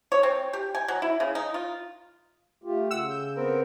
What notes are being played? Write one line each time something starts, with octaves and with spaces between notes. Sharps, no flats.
C#5
C4
G4
G#5
F#3
E4
C#3
D#4
F4
A3 F4 G4
C#3 F#5 E6
G6
B3 C4 A#4